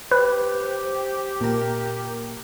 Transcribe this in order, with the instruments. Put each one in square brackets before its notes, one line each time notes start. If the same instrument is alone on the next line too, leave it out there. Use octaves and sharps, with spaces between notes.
[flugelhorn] G4 [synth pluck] B4 [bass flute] C5
[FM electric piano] A#2 A#5 [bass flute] A#4